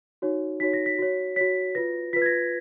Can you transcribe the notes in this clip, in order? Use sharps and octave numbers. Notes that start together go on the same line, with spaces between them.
D#4 F#4 C#5
D#4 F#4 C#5 B6
A#6
B6
F#4 C#5
F#4 C#5 B6
F4 B4 A#6
F4 B4 B6
G#6
A#6